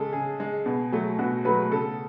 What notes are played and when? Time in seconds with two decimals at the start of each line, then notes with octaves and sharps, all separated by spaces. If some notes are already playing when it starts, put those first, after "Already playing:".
Already playing: C#3 G#3 A4
0.13 C#3 G#4
0.40 G#3
0.66 B2
0.92 F#3 A3
1.19 B2 F#4
1.45 F#3 A3 B4
1.71 C#3 A4